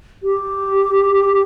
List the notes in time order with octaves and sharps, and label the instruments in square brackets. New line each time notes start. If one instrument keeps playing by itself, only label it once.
[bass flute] G4